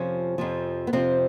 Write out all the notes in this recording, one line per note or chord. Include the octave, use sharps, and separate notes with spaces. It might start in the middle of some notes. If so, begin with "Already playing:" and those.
Already playing: F2 C3 F3 C#4
F2 C3 F3
B3
F2 C3 F3 C4